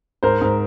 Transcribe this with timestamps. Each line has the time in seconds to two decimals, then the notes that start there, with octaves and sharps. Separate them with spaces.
0.23 G#2 A#4 C5
0.41 G#2